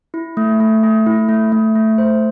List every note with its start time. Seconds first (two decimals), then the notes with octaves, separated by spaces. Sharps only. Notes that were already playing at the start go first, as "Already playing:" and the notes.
0.14 E4
0.37 A3
0.60 A3
0.83 A3
1.06 E4
1.29 A3
1.52 A3
1.75 A3
1.98 C5